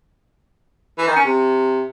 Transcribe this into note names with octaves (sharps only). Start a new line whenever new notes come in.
E3
D#3
C#4
C3